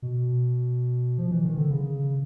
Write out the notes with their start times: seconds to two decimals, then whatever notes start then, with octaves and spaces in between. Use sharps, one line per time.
0.02 B2
1.18 F3
1.31 E3
1.44 D#3
1.57 D3
1.71 C#3